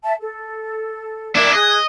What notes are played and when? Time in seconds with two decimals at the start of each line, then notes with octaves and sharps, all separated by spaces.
0.02 E5 A5
0.19 A4
1.35 D4 E4 A#4 D5
1.53 G#4 D#5 F#6 G#6